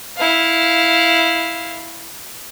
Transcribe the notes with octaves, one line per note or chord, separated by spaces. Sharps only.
E4 F5